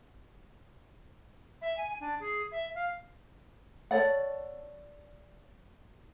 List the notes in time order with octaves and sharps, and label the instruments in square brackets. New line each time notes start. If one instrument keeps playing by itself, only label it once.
[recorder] E5
G#5
D4
G#4
E5
F5
[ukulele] A4 C#5 D5 F#5